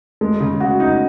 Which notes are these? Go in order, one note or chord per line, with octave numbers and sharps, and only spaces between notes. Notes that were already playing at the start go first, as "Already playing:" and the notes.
G#3
C#3
F#4
D#4